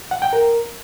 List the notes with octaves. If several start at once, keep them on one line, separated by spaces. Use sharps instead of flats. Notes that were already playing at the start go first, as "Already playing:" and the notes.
F#5
G5
A#4